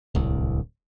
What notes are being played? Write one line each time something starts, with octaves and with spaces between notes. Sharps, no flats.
D1 C2